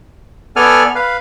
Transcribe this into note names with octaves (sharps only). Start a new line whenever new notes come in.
B3 A4 D5 G#5 F6
B4 F5